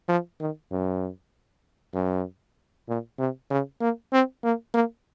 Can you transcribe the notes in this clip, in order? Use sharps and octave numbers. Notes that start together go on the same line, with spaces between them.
F3
D#3
F#2
F#2
A#2
C3
C#3
A#3
C4
A#3
A#3